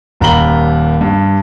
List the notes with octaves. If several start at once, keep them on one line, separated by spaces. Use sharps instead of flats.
D#1 D#2 A#5 B5 F#7 G7
G2